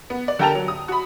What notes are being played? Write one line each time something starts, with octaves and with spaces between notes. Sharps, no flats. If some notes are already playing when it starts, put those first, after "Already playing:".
B3
D5
D3 G4 A#4 G5 A5 F7
F#3
D#6
F#4 B5